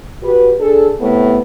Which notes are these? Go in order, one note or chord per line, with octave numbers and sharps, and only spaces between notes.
F#4 G4 B4
D4 G#4 A4
A2 C3 A3 B3